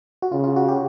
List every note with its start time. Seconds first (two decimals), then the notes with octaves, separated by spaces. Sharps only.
0.22 F#4
0.32 C#3 F4
0.44 F4
0.56 F#4
0.68 G4